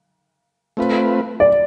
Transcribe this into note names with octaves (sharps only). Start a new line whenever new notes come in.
A3 C4 F4 B4
D5